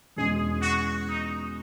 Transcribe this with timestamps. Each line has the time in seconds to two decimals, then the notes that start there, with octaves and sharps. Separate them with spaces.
0.16 E2 B2 G#3 C#4 G#4
0.60 F#4
1.07 D#4